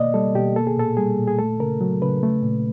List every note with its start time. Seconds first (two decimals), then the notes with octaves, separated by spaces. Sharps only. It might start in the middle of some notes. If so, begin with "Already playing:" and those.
Already playing: B2 A#3 D5 D#5
0.14 G3 A4
0.35 B2 G4
0.56 A#3 A4
0.67 G#4
0.77 A#2 A4
0.97 G3 G#4
1.19 A#2
1.27 G#4
1.39 A3 A4
1.60 C#3 A#4
1.81 F#3
2.02 C#3 B4
2.23 A3
2.43 A#2